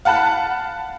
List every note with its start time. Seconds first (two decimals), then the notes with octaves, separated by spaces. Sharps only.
0.05 F5 F#5 A5 B5 F#6